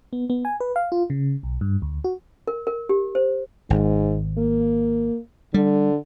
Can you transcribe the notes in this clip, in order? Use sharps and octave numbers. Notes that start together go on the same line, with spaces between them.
B3
B3
G#5
B4
F5
F4
C#3
B1
G2
D2
F#4
A#4
A#4
G4
C5
G#1 G#2
A#3
D3 G3